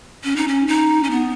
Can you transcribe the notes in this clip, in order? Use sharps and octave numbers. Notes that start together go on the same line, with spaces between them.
C#4
D#4
C#4
D#4
C#4
B3